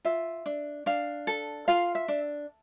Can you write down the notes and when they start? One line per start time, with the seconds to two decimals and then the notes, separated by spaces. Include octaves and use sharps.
0.05 F4 E5
0.46 D4
0.86 D4 F5
1.27 A4
1.68 F4 F5
1.95 E5
2.08 D4